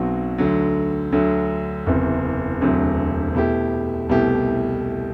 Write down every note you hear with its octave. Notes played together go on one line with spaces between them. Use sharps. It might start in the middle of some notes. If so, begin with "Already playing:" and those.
Already playing: B1 B2 F#3 C4 F#4
D2 D3 F#3
D2 D3 F#3
F#1 E2 C3
E1 D2 C3 F#3
B2 A3 E4 G4
C2 B2 A3 E4 G4